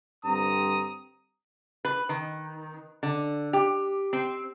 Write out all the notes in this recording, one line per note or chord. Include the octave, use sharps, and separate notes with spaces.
G2 D3 C4 A#5 D#6
B4
D#3
D3
G4
C4